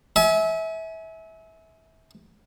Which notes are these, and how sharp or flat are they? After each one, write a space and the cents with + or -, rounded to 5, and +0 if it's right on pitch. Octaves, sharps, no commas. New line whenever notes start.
E5 -25 G#5 +25